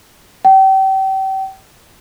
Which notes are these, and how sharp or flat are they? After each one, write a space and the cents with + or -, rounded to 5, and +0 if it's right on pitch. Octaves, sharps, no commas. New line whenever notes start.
G5 -35